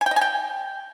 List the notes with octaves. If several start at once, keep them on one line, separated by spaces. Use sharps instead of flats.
G#5
G5
D#5
G#5
G5